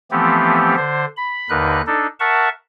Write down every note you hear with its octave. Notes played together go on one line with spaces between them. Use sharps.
E3 F3 A3 B3 C4 G4
D3 C5
B5
D#2 D3 D#4 A#4 B4 F#6
D4 D#4 A4
A#4 E5 F#5 A5 C#6